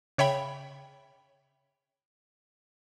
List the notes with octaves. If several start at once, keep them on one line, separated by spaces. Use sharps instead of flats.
C#3 C#5 E5 G5 B5